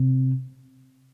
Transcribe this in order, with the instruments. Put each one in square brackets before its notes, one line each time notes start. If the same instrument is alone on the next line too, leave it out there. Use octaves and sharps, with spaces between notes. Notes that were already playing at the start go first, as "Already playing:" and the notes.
Already playing: [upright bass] C3